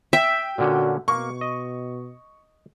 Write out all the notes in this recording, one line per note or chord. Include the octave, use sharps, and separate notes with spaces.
E5 G5
A#2 D3 C#4 F#4
B2 A#3 C#6
D#5